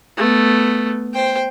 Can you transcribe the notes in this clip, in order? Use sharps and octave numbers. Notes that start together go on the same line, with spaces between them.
A3 B3
C5 G5